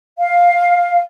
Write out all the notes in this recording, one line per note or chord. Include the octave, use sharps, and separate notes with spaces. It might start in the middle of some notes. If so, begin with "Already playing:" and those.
F5